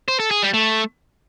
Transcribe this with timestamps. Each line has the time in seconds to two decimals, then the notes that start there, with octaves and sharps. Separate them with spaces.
0.08 C5
0.20 A4
0.31 G#4
0.42 G3
0.54 A3